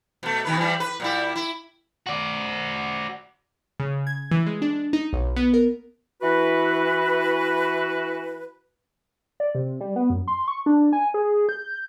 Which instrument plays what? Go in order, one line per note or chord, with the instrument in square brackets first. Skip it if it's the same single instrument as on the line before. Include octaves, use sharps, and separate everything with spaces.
[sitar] B2 A3
B2 D#3 B4
E3 G3
B4
A#2 G3 E4
E4
[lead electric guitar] F#4 D5
[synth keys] C#3
G#6
E3
G#3
D4
D#4
B1
B3
A#4
[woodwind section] E3 F#4 B4
[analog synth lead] D5
C3
G3
B3
F#2
C6
C#6
D4
G#5
G#4
G6